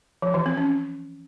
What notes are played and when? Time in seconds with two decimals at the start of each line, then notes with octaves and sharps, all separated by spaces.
0.22 F3
0.34 E3
0.46 C4
0.57 C#4